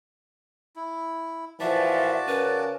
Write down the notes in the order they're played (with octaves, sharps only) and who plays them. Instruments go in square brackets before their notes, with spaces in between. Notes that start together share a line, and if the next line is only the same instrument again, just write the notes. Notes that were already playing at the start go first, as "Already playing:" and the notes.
[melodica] E4
[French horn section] A#2 E3 F3 [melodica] F#4 D5 A5 [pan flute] E5
[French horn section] C#3 C#4 A#4 [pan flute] B4